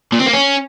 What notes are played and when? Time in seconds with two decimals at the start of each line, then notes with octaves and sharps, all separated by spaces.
0.13 A#2
0.20 C4
0.27 A#3
0.34 C#4